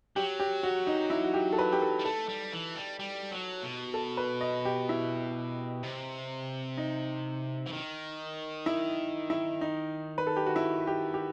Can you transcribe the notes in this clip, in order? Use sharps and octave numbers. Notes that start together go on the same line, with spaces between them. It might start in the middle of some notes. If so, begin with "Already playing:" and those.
F#3 G4
G4
F#4
D#4
E4
F#4
G4
A4
B4
G4
A4
G3
A3 A4
G3
E3
G3
G3
F#3
B2
A4
B4
D#5
G4
E4
C3
D#4
E3
D#3
E4
E4
D#4
B4
A4
G4
F#4
E4
G4
G4